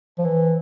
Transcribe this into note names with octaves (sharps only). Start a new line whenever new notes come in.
F3
E3